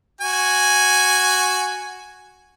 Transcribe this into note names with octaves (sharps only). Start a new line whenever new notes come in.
F#4 G#5